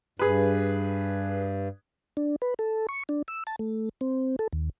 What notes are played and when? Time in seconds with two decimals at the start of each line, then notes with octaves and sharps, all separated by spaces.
0.19 G2 G#4 B4
2.17 D4
2.42 B4
2.59 A4
2.89 C#6
3.09 D4
3.28 E6
3.47 A5
3.59 A3
4.01 C4
4.39 A4
4.53 D#2